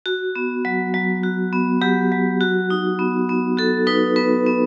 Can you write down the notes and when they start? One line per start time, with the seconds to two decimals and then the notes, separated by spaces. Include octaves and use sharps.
0.06 F#4
0.35 B3
0.65 F#3
0.94 F#3
1.23 F#4
1.53 B3
1.81 F#3 G4
2.12 F#3
2.41 F#4
2.70 D#4
2.99 B3
3.29 B3
3.57 F#4 A4
3.87 D#4 B4
4.16 B3 B4
4.46 B3